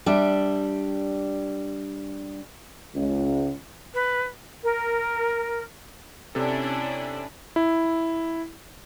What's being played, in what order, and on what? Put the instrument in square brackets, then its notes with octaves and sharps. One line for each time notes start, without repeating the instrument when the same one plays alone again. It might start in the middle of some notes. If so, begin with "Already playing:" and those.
[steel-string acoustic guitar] G3 D4 E5
[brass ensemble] C#2
[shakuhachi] B4
[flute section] A#4
[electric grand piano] C3 A4 [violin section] C#4 D4 E4
[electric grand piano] E4